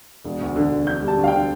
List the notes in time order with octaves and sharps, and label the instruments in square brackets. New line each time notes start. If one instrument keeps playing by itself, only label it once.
[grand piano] E1
D2
D3
E1
D3 G6
G3
A5
D2
F5
G5
D3